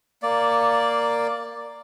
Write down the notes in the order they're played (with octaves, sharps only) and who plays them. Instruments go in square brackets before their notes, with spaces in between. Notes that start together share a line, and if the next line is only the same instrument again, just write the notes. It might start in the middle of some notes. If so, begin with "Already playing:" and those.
[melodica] A#3 D5